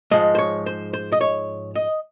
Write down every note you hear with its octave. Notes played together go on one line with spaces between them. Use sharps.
G#2 F3 G#3 D#5
C5
C#5
C5
C5
D#5
C#5
D#5